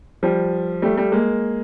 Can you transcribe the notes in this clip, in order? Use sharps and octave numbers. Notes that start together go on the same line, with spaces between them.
F3 G3
G3 A3
G3 A3
G#3 A#3